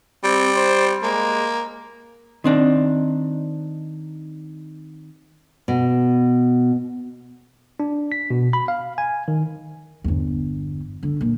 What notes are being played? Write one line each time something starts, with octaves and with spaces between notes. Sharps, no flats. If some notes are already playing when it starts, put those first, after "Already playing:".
G3 C4
C5
G#3 A#3
D#3 C4 D4 D#4
B2
D4
B6
B2
B5
F5
G#5
D#3
G1 E2
D3
A#2